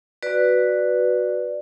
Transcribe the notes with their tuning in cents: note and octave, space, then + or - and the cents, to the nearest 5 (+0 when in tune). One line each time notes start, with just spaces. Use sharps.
F#4 +0 B4 +0 D5 +5